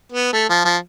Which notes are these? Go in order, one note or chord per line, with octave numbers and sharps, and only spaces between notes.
B3
A3
F3
F3